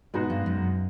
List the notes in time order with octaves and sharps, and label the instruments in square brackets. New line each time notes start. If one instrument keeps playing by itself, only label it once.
[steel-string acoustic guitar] G#2 [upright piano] B2 G#3 B3 D#4 F#4
[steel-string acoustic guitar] G2
F#2